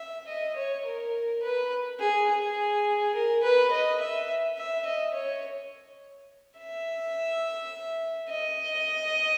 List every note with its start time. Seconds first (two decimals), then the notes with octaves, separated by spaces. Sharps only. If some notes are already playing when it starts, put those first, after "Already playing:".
Already playing: E5
0.28 D#5
0.56 C#5
0.85 A#4
1.42 B4
2.00 G#4
2.28 G#4
3.15 A#4
3.43 B4
3.71 D#5
4.00 E5
4.57 E5
4.85 D#5
5.14 C#5
6.58 E5
8.30 D#5